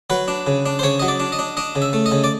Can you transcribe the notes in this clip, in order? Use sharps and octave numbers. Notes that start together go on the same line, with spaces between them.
F#3 B4
D4
C#3
D4
C5
C#3 C#5
F#3 D#5
D5
D4
D#5
D4
D4 D#5
C#3
E5
A3
D#5
C#3
D5